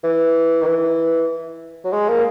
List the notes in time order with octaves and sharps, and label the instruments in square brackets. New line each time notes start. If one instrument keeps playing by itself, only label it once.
[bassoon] E3
D#3
E3
F#3
G#3
A#3